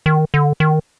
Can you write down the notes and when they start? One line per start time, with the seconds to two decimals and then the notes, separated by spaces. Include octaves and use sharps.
0.06 D#3
0.34 D3
0.60 D#3